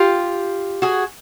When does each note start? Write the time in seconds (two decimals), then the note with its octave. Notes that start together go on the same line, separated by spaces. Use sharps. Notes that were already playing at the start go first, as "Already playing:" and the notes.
Already playing: F4 G4
0.82 F#4 G#4